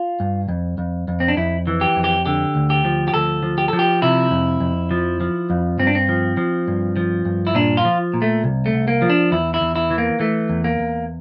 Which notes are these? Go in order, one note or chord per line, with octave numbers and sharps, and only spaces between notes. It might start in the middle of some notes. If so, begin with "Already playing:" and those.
Already playing: F4
G2
F2
F2
F2
C4
D4
F2 E4
E3
G4
F2
G4
D3 G4
D2
G4
F3
G4
D2 A4
F3
G4
F3 A4
G4
C3 E4
F2
F2
F3
F3
F2
G2 C4
D4
C4
F3
F3
G2
F3
G2
E4
A#2 D4
F4
F3
A#2
A3
C2
A3
C2
A#3
F3
D4
E2 E4
E4
E2
E4
E3
A#3
E3 A3
E2
A#3
E2